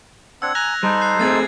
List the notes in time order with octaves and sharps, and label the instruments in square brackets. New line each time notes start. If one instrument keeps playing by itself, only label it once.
[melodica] C4 D4 F#5 [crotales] E6 G#6
[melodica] G#5 A#5 [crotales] F#6 A#6 F7
[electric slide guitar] G3 [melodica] D#4 A4 C5
[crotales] F#6 C7
[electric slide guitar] A3 C4 G#4 [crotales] G#6 A6 C7